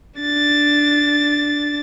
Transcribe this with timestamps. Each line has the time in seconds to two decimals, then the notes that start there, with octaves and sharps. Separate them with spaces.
0.21 D4 A6